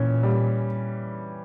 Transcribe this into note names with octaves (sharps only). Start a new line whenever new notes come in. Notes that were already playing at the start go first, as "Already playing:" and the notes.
Already playing: A#2 E3 C#4
G3